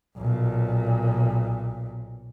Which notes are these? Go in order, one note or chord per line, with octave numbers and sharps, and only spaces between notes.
B1 A#2